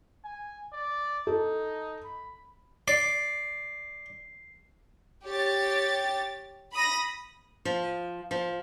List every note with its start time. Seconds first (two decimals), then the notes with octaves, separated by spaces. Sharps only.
0.24 G#5
0.73 D5
1.27 D#4 A4
2.05 B5
2.88 D5 C7
5.26 G4 C#5 A6
6.73 B5 D#6 A#6
7.65 F3
8.31 F3